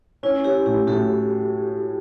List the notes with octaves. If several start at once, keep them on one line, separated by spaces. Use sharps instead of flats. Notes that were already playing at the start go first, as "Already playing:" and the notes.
C#4 E4
C#4 E4 G4
A2 E4 G4
A2 F#4 A4